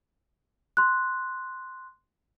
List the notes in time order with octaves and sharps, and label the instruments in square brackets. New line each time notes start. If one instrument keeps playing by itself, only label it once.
[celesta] C6 F#6